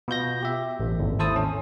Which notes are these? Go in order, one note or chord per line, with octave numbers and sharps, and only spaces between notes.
B2 F4 G6 A#6
G4 E5
A1
G#1 D#2
E4 A4 C5 A5 D#6
C#4